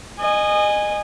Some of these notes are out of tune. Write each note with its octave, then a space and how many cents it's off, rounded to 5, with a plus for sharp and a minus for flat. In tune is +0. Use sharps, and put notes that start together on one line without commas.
D#5 -25 G#5 -10